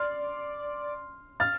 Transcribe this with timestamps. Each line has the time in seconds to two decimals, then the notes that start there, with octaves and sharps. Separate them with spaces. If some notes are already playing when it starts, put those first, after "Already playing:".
Already playing: D5 C6 F6
1.40 F5 F6 A6